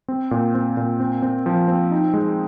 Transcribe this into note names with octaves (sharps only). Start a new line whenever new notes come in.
C4
A#2
C4
A#2
C4
C4
F3
C4
D#4
G#3